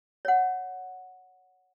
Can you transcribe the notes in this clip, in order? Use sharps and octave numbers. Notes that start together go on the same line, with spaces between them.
C#5 F#5